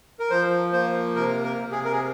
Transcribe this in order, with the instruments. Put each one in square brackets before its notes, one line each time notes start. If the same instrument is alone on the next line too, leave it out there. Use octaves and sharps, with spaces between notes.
[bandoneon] A#4
F3 C5
A#3 C5
C3 A#4
A#4
C3
G#4
A#4
G#4